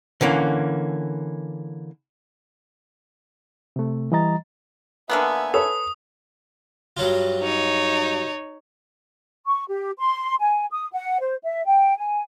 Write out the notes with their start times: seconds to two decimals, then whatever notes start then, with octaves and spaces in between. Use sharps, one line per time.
0.21 D3 E3 A#3 C#4
3.76 C3 A3
4.12 E3 G3 D#5 A#5 A6
5.09 D3 A#3 B3 E5 G#5
5.54 A4 B4 C#5 D#6
6.97 G2 F#3 F4
7.43 D#4 C#5
9.46 C#6
9.69 G4
9.98 C6
10.40 G#5
10.72 D#6
10.93 F#5
11.20 C5
11.44 E5
11.65 G5
11.97 G#5